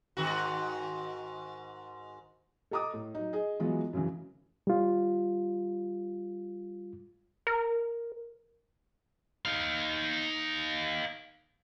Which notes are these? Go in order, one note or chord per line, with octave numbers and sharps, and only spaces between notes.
G#2 D#3 F#4
A4 D#5 A#5 D6 D#6
A2
F#3 D#4
G#4 D#5
E3 F#3 G#3 B3 F4
F#2 C#3 E3
G3 F4
A#4
D#4 F5